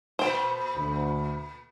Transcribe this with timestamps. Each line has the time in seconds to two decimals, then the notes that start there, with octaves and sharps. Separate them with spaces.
0.19 A#2 A3 B3 C5 G5
0.76 D2